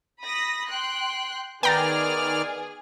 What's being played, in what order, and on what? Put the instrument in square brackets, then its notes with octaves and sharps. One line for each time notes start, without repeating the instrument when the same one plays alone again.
[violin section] B5 D#6 A#6
G5 C6 F#6
[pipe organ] D#3 D5 F6 [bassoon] B3 [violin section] G#4 [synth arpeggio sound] G5 A#5 A6